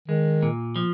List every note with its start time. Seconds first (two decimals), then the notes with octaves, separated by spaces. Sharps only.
0.08 D#3 G#3
0.42 A#2
0.76 F3